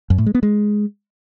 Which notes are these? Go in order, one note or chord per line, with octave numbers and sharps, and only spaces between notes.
F#2
A2
G#3
B3
G#3